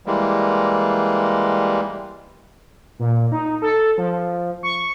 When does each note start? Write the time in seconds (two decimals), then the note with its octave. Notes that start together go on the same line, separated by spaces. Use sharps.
0.06 E3 G3 G#3 A#3
2.99 A#2
3.32 D#4
3.62 A4
3.98 F3
4.63 C#6